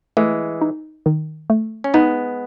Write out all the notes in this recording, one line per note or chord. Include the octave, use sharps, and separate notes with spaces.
E3 G#3 A3
D#4
D#3
A3
C#4
G#3 B3 D#4